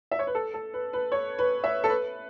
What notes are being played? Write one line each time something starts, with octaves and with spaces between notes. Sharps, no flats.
E5
C#5
B4
A4
A4
B4
B4
C#5
B4
E5
A4
B4